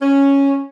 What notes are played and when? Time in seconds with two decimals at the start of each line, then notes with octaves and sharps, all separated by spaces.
0.02 C#4